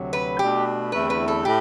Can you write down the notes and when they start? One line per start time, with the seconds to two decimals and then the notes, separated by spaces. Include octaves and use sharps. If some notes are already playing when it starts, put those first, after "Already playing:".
Already playing: D2 C3 F#3
0.13 B4
0.39 B2 A3 D4 G4
0.92 E2 D3 A3 C4 E4 B4
1.10 B4
1.28 A4
1.45 A2 G4